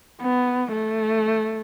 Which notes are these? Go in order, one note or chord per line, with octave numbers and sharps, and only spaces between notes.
B3
A3